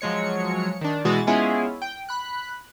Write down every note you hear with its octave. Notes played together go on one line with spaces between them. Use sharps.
F3 F#3 G#3 C#5 C#7
D#3 D4
B2 E3 G#3 F#4 G#4 A6
G#3 B3 C#4 E4 F4 G#4
G5
B5 F#6